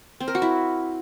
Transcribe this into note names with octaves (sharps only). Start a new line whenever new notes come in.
C4
A#4
F#4
E4